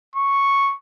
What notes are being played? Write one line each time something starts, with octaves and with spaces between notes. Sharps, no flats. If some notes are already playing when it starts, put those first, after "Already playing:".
C#6